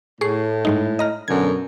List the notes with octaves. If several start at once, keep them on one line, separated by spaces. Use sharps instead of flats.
A2 G#4 C#6 C7
G#2 G#3 D#4
D#5 A#5 F6
F#2 B2 D3 G#6